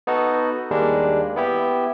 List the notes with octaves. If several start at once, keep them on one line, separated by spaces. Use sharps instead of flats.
B3 D#4 F#4 A4
D#2 G3 G#3 A#3 D4
B3 E4 G4